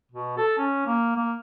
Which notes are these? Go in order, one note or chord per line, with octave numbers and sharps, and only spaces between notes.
B2
A4
C#4
A#3
A#3